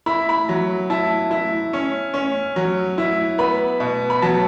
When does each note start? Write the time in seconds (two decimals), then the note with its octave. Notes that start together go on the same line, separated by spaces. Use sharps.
0.06 E4 B5
0.29 B5
0.49 F#3
0.90 E4 A5
1.31 E4
1.73 C#4
2.14 C#4
2.56 F#3
2.98 E4
3.38 B3 B5
3.80 B2
4.10 B5
4.22 F#3 A5